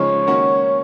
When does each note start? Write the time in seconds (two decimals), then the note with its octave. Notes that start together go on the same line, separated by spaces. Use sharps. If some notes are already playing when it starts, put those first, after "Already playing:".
Already playing: C#3 F3 G#3 D#4 C#5
0.27 D#3 A#3 C#4 F#4